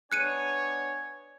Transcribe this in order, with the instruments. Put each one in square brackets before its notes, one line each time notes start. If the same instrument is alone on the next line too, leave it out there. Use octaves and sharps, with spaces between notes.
[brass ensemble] B3 D4 C#5 [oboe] G#5 [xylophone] F#6 C#7 D#7